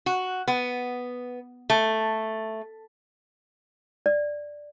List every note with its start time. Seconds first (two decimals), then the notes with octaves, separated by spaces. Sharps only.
0.06 F#4
0.48 B3
1.70 A3
4.06 D5